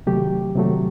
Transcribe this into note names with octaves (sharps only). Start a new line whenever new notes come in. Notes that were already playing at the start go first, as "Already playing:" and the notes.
C3 D#3 F#3 A3 G4
C3 D#3 F#3 A3